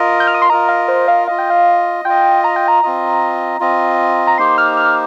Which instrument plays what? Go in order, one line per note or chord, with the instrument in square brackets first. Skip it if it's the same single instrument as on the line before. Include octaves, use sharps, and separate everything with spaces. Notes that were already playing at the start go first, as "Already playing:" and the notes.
Already playing: [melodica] F4 A#4 D#5
[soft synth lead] G6
F6
D#6
C6
[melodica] F4 A#4 D#5 [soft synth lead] A#5
[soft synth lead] F5
C5
F5
[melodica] F4 D#5 [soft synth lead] F5
[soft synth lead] G5
F5
[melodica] F4 D#5 [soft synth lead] G5
[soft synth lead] A#5
G5
A#5
[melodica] C4 F4 D#5
C4 F4 D#5
[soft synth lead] A#5
[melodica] A#3 D#4 G4 C5 [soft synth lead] C6
[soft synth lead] F6
F6